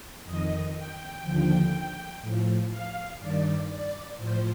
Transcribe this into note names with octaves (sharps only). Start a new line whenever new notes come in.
F2 D#3 D#5
G5
D#2 D3 F3
A2 F3
F5
G2 D#3 D5
D5
A2 F3 C5